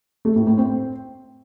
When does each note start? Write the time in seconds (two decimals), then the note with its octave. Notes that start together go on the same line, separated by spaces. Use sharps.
0.25 A3
0.36 A2
0.47 A2
0.58 C4